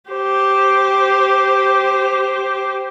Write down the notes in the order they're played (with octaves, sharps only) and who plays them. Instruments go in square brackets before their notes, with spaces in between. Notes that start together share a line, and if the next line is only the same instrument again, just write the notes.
[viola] G4 C5